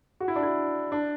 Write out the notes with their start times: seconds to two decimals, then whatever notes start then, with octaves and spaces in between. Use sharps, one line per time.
0.20 F#4
0.28 E4
0.36 D4
0.43 E4
0.92 D4